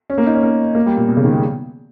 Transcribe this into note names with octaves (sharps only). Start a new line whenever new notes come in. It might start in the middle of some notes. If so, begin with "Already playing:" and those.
C#4
A#3
D#4
C#4
A#3
A#3
G3
A#2
B2
C#3
D#3
G#3